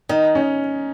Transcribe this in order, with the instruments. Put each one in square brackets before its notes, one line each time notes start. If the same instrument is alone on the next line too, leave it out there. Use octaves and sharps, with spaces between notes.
[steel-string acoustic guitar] D#3 [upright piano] D#4
[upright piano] C#4